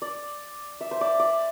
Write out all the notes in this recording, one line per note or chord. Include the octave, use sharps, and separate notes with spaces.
D5
E5
C5
D5
D5